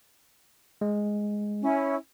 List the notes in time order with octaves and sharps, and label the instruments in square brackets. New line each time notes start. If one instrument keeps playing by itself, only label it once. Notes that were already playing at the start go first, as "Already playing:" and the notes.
[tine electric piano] G#3
[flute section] C#4 E4